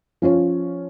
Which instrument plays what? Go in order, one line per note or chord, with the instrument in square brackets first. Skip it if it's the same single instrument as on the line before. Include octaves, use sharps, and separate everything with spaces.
[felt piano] F3 C#4 F4 C#5